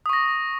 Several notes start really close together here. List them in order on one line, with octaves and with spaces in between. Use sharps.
D#6 C#6 A#6